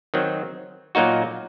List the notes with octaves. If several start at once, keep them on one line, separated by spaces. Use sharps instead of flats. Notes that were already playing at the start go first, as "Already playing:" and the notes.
D#3 F#3 C4
A#2 F#3 A#3 D#4 F#4